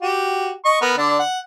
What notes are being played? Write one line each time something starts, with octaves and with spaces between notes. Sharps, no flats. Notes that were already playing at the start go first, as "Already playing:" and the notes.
F#4 G4
D#5 C#6
B3 A#4
D3 D4 D5
F#5